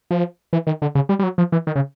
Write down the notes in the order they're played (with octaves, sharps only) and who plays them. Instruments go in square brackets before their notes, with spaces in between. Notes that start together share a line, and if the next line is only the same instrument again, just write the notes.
[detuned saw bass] F3
E3
D#3
D3
C#3
G3
G3
F#3
F3
E3
D#3
C#3